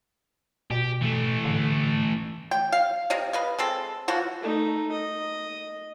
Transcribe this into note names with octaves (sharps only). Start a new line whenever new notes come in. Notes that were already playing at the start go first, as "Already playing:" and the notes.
B2 G4
E3 A3
D3
G5
F5
C3 D#5 F5
B4 D#5 F5
G#3 C4 A4
E3 F3 F#4
A3 D#4
D#5